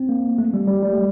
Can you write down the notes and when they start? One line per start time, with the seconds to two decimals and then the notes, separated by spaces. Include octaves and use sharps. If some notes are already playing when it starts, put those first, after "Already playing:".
Already playing: C4
0.09 A#3
0.38 A3
0.54 G3
0.68 G3
0.83 G3
0.93 A3